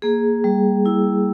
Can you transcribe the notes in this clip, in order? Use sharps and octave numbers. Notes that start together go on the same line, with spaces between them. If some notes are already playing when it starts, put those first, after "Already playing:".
A#3 G#4
G3
E4